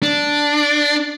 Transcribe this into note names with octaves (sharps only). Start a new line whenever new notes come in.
D4